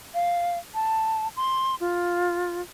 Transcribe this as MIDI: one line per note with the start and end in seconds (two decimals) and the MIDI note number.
0.14 0.58 77
0.74 1.28 81
1.37 1.75 84
1.80 2.62 65